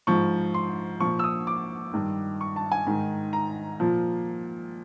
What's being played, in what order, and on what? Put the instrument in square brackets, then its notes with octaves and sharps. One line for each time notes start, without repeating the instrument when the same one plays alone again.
[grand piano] G#2 F3 C#6
C6
A#2 F3 C#6
E6
D#6
D6
G2 D#3
C#6
A5
G#5
G#2 D#3
A#5
A#2 F3